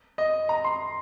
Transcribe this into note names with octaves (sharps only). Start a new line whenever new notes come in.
D#5
A#5
C6